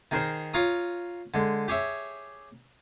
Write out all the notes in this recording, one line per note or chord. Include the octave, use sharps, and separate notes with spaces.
D#3 D#4 G#4 A#4 C5
F4 C#5 F5 A#5 D#6
D3 G#3
G4 G#4 C#5 E5